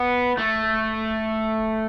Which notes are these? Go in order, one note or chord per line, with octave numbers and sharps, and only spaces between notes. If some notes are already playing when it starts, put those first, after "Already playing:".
Already playing: B3
A3